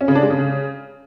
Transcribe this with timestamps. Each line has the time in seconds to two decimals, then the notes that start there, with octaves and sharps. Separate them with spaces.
0.01 C#4
0.08 C#3
0.15 D4
0.23 G#3
0.30 C#3